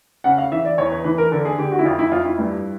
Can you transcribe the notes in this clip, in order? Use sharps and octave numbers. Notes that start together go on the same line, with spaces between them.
C#3 F#5
F5
E3 E5
D5
E2 C#5
B4
E3 B4
A#4
D3 A4
G#4
D3 G4
F#4
E4
F2 F4
E4
F2 F4
E4
G2